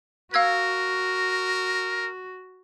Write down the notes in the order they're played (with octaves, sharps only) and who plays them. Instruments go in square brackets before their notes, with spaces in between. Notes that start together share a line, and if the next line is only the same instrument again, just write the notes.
[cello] F#4 [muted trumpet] A#4 [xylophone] F5 E6 G#6